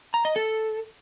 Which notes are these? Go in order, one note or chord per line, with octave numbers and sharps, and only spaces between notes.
A#5
D#5
A4